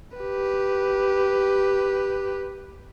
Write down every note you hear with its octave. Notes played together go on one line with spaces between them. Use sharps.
G4 B4